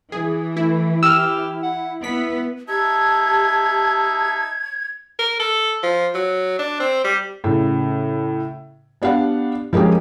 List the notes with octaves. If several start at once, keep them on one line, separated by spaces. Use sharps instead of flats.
E3 G#4
A3 E4
G4 E6 F6
F#5
B3 E4 B6
D#4 G4 E5 A5 G#6
A#4
A4
F3
F#3
D4
C4
G3
A2 C#3
B3 D4 G4 F5 F#5
F3 G#3 A#3 C#4 G4